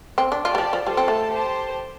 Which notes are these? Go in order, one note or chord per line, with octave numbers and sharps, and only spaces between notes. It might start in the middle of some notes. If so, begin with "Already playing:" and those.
C4
D4
F4 G4 D5 A5
G3
F3
F3
G3 F4 A4 C5 A5
C4
A3
G4 C5 A5